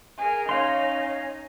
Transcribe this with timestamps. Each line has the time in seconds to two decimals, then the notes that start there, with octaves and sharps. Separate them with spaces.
0.17 G#4 A#4
0.49 C#4 D#4 C#5 F5 C6